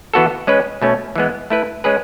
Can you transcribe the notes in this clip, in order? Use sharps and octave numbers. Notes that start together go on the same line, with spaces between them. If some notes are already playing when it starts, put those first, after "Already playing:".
E3 B3 F#4 A4
G#3 C#4 G#4 B4
B2 A3 C#4
E3 G#3 B3
A3 E4 B4
G#3 C#4 G#4 B4